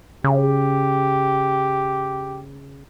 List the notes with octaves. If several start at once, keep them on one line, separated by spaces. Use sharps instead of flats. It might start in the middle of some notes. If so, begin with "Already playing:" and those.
C#3 G4